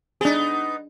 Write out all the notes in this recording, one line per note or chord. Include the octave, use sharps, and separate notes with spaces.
B3 D4 D#4 G#4